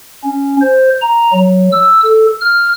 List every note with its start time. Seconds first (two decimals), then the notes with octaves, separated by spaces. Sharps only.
0.24 C#4
0.61 C5
1.01 A#5
1.33 F#3
1.72 E6
2.04 A4
2.41 F6